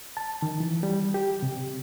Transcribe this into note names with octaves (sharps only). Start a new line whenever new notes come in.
A5
D#3
E3
G3
G4
C3